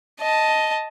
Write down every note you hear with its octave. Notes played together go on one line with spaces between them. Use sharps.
D#5 A5